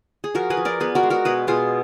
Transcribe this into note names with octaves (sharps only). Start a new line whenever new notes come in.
G#4
F3 F#4 A#4
G#4 B4
F3
A#4 D5
B3 G#4 B4
F#4 A#4
G#3
F#4 A#4
B2 G#4 B4
B2 F4 G#4